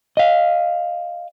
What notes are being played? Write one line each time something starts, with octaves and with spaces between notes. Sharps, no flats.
D#5 F5